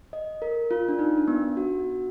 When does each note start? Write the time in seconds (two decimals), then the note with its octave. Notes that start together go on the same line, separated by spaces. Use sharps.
0.13 D#5
0.42 A#4
0.71 F4
0.88 D4
0.99 D#4
1.18 D4
1.28 B3
1.57 F#4